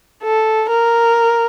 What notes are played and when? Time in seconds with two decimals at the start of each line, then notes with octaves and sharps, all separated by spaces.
0.24 A4
0.70 A#4